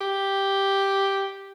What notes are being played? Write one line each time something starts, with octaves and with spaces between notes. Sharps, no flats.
G4